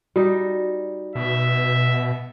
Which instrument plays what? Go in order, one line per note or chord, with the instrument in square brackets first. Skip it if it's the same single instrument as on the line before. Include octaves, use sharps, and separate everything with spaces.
[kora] G3 D#4 [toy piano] F#4
[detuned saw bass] B2 [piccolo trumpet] E5